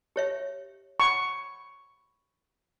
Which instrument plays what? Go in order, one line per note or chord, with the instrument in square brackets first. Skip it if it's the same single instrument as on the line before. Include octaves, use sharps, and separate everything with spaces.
[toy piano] G4 C#5 E5
[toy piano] B5 [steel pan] C#6